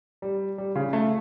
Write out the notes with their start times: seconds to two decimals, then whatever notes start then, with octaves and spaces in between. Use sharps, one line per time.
0.22 G3
0.58 G3
0.76 C#3
0.93 A3